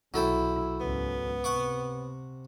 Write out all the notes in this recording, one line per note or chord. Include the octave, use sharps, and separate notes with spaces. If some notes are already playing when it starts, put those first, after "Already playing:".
B1 F#3 E4 A4 G5
C#2 G#2 B3
C3 F#5 C#6 D6